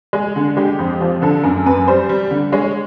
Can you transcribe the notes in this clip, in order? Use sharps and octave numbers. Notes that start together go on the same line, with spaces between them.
G#3
D3
G#3 G4
F2
F3
D3 A4
F#2 A#4
F#2 B4
G3 C5
G3
D3
G#3 C#5